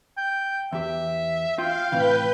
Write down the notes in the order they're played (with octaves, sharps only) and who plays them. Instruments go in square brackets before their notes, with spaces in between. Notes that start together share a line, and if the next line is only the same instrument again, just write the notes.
[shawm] G5
[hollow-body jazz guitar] E2 G4 [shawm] E5
[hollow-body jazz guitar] F4 [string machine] F5 [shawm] G5
[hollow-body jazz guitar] A2 C3 E3 [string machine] B4 G6